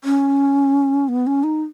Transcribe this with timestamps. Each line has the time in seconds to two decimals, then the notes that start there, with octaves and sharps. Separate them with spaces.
0.04 C#4
1.09 B3
1.27 C#4
1.44 D#4